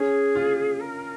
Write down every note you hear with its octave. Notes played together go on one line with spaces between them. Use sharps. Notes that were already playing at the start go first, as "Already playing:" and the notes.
Already playing: C#4 G#4
F4
A#4